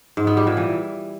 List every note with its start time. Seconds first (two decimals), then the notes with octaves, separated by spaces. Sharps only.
0.17 G#2
0.27 B3
0.37 G3
0.47 A#2
0.57 E3